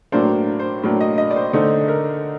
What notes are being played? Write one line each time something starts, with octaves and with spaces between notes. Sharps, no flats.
A2 F#3 A#3 D4 C5
C5
A2 F#3 A#3 D4
D#5
D#5
D5
C5
D3 A3 D#4 C5
A#4